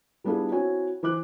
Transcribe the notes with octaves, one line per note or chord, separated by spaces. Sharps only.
G3 B3 D4 E4 F4 G#4
C4 E4 F#4 C#5 G#5
E3 C5 D6 F#6